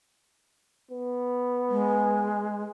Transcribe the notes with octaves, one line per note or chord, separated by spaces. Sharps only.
B3
G#3